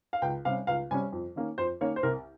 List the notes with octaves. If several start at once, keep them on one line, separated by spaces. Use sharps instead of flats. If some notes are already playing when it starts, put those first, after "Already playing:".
F5
C#2 G5
C3 G3 C#4 F5
C#2 F5
C3 G3 C#4 G#5
F2
D#3 A#3 C#4
F2 C5
D#3 A#3 C#4 C#5
C5
C2 A#4